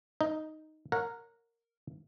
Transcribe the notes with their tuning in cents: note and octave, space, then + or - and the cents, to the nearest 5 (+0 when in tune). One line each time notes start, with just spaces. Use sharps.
D#4 +0 D#5 +0
A#4 -10 C#5 +0 F#5 -30